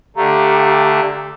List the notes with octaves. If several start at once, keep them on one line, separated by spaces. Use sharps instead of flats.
D3 A3 G4 F5 A#5